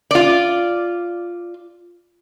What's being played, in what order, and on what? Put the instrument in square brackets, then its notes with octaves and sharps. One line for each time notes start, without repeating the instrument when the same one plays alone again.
[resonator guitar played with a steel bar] F4 D5